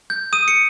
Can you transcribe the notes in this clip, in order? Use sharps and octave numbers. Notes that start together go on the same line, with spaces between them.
G6
D#6 D#7
C#7